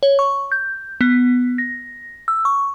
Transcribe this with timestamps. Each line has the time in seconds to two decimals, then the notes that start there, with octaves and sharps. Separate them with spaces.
0.03 C#5
0.19 C#6
0.52 G6
1.01 B3
1.58 A#6
2.28 E6
2.45 C#6